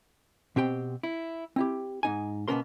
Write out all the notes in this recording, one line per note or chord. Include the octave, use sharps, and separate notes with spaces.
B2 C4 G4 G5 C6
E4
C4 E4 G4
G#2 D#4 G#5
B2 A#3 B3 C#4 A#4 C6